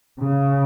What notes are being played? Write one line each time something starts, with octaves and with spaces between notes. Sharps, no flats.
C#3